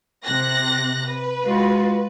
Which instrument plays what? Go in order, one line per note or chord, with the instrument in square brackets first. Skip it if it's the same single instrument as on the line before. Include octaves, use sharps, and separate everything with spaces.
[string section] C3 F#6 A#6
B4
[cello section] G#3 F4 F#4